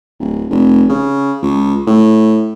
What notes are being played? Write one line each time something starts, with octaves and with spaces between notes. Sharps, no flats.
D1
F1
C#3
C#2
A2